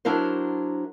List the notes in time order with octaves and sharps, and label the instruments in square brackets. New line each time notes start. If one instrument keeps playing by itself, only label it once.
[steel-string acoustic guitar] F#3 D4 E4 A#4 C5